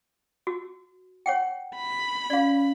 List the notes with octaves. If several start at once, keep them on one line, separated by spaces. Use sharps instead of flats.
F#4
C#5 F#5 G5
B5
C#4 D5 F5